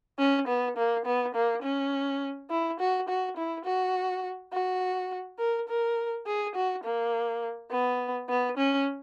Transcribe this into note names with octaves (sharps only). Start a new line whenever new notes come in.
C#4
B3
A#3
B3
A#3
C#4
E4
F#4
F#4
E4
F#4
F#4
A#4
A#4
G#4
F#4
A#3
B3
B3
C#4